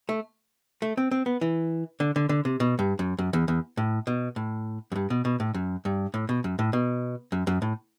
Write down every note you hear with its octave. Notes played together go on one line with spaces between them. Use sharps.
A3
A3
C4
C4
B3
E3
D3
D3
D3
C3
B2
G2
F#2
F#2
E2
E2
A2
B2
A2
F#2
G2
B2
B2
A2
F#2
G2
A2
B2
F#2
A2
B2
F#2
F#2
A2